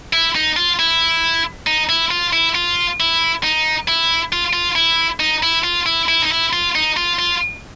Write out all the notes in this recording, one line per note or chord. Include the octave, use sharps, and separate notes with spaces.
E4
D#4
F4
E4
D#4
E4
F4
E4
F4
E4
D#4
E4
F4
F4
E4
D#4
E4
F4
E4
E4
D#4
E4
F4
D#4
F4
F4